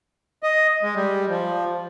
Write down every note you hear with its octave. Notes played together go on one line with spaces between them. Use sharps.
D#5
G#3
G3
F3